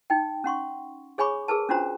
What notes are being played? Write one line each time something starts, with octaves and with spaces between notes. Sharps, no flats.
D#4 G5
C#4 F#5 C6 C#6
G#4 C#5 G#5 B5 C#6 D6
G#4 A#4 B4 A5
C#4 D4 F4 F#4 C5 A#5